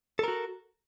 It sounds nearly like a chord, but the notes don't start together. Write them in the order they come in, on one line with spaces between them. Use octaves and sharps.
A4 A#4 F#4